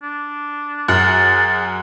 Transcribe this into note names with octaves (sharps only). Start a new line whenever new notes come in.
D4
F#2 G#4 F#6 A6